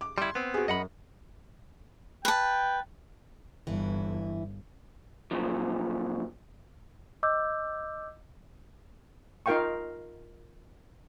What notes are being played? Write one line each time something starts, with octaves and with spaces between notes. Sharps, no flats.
D6
G3 E4 C6 G#6
B3 C4
F#4 G#4
F#2 D#5 F#5 B5
B4 G5 A5
G1 E3 E4
A#2 C#3 F3 F#3
D#5 D6 E6 G6
D#4 F4 A#4 F5 G5 C#6